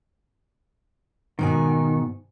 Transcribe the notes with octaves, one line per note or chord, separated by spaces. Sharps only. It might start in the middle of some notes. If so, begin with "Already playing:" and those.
G#2 B2 D#3 G#5